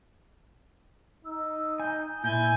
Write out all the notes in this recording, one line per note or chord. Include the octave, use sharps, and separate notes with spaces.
D#4 E6
G#5 G6
A#2 E4 G#5 G6